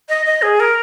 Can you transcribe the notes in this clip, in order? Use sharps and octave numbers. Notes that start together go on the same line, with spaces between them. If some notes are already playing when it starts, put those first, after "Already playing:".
D#5
D#5
G#4
A#4